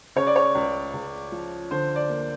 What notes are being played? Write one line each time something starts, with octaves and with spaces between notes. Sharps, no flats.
C#3 C#5
D5
C#5
C#2
C#2
F3
D3 C5
D5
A#3